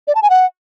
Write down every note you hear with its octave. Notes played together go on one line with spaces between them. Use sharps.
D5
A5
G#5
F#5